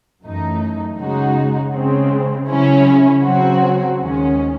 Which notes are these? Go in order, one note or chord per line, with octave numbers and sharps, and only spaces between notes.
F#2 E3 A3 D#4
C#3 G#3 D#4 F#4
C#3 G#3 C4
C#3 F#3 C#4 E4
C#3 F#3 C4 F#4
D#2 D#3 G#3 C#4